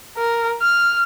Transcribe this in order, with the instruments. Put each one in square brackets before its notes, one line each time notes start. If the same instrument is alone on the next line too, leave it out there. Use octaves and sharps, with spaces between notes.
[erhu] A#4
F6